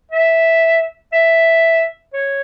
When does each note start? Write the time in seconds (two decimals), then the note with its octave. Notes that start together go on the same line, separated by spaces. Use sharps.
0.12 E5
1.13 E5
2.14 C#5